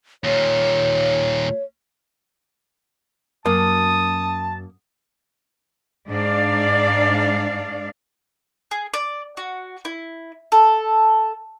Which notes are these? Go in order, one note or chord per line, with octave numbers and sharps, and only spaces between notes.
D#2 A#2 C#5
F#2 A#3 A5 D#6
G#2 D4 D5 F5
G#4
D5
F#4
E4
A4